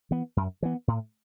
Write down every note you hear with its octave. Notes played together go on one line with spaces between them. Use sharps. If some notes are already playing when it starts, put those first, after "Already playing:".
E3 B3
F#2
E3 B3
A2